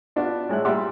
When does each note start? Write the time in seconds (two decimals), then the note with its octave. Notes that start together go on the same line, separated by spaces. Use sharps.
0.16 B3 D4 F4 F#4
0.49 A2 G#3 E5 F#6
0.65 A#2 G3 E5 F#5 C6 D6